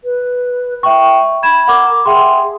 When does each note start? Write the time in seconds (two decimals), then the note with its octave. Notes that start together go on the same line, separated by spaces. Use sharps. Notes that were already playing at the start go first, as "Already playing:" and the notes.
0.04 B4
0.83 E5 G5 C#6
1.43 B5 G#6 E7
1.68 A#4 F#5 D6
2.06 G#4 E5 G5 C6